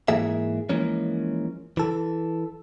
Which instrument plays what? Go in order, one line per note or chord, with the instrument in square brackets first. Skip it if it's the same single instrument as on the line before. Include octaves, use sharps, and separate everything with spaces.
[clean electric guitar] G#2 E3 A#3 G#4 E5
E3 F3 G#3 A#3 C#4
E3 A4